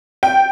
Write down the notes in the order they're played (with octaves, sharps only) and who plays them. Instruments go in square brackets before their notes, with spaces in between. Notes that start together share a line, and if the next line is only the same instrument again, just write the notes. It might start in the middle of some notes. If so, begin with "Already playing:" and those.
[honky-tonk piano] G5